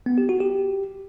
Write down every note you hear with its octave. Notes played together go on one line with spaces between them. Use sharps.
B3
G4
F#4
G4